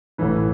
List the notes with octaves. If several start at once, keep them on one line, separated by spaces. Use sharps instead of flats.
A1 A2 E3 B4